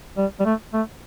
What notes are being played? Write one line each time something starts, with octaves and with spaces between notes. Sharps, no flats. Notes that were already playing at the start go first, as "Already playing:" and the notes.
G3
G3
A3
A3